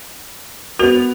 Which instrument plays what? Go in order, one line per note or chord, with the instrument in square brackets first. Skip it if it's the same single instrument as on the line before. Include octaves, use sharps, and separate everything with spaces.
[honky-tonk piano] B3 F7 [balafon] F#4 A#4